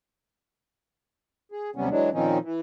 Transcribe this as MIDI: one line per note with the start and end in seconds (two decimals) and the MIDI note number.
1.52 1.70 68
1.76 1.89 39
1.76 1.89 48
1.76 1.89 54
1.76 1.89 55
1.76 1.89 59
1.76 1.89 61
1.90 2.10 52
1.90 2.10 54
1.90 2.10 56
1.90 2.10 62
2.13 2.38 46
2.13 2.38 51
2.13 2.38 53
2.13 2.38 60
2.13 2.38 61
2.13 2.38 63
2.43 2.60 52